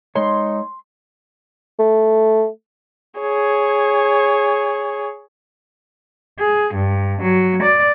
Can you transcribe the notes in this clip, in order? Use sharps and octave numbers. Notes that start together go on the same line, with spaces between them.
G#3 D#4 C#5 C6
A3
G#4 C#5
G#4
G2
F#3
D5